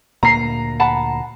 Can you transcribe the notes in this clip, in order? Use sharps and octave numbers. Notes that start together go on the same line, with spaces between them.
D2 A#2 A#3 A#5 C7
F#5 A5 B5